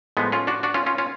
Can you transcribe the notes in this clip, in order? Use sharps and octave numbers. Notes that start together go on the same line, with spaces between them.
A2 F3 G#3 B3
C#4 F4
D4 F#4
D4 F#4
C#4 F4
C#4 F4
C#4 F4